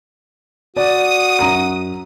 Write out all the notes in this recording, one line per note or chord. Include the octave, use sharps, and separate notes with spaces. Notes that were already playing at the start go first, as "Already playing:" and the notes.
F#4 D5 D#6
F#2 A#5 D#7